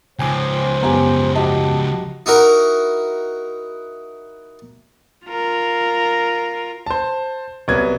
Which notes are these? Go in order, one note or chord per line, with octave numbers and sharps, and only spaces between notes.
C#2 F3 C5 G5 G#5 D6
F#2 B3 G4 G#5 A#5
F#4 G4 D#5 A5
D#4 E4 F#4 A#4
F4 A#4
C5 A5
C2 F#3 B3 G#6